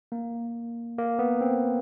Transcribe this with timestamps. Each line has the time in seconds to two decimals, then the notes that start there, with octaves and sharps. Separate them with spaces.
0.12 A#3
0.98 A#3
1.19 B3
1.41 C4